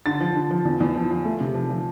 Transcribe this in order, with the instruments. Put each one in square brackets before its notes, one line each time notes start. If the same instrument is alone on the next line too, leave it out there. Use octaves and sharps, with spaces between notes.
[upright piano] D3 A6
F3
D3
F3
E2
E2
F3
F3
A3
C3
F3
F3